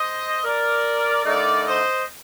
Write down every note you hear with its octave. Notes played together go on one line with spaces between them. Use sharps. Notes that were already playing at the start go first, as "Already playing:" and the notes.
Already playing: C5 D#5
A#4 D5
D3 A3 D#4 A#4 D5
C5 D#5